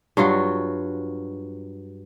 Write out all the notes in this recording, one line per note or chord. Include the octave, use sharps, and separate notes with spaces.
G2 F#3 F4 F#4